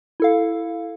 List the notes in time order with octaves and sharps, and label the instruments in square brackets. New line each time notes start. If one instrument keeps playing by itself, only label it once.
[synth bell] E4 A4 F5